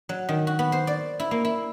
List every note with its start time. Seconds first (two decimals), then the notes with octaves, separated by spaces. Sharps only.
0.09 F#3
0.29 D#3
0.47 F#4
0.59 B3
0.72 C5
0.87 D5
1.20 E4
1.31 A#3
1.45 E4